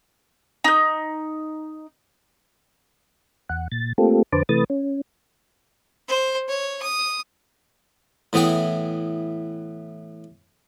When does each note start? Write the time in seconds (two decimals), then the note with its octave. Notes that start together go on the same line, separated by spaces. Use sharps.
0.64 D#4 G6
3.50 E2 F#5
3.72 A#2 A6
3.98 A3 A#3 C4 F4 G4 A4
4.33 F2 D3 B4 C5 A5 D6
4.49 C3 E3 A3 B4 D#6 A6
4.70 C#4
6.08 C5
6.48 C#5
6.82 D#6
8.33 A2 E3 B3 G#4 G5